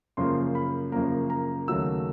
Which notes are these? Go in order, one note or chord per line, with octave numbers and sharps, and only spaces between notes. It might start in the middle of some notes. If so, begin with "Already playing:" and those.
F#2 C#3 F3 A#3 C6
B5
F#2 C#3 F3 A#3 A#5
A#5
D#2 C#3 F#3 A3 E6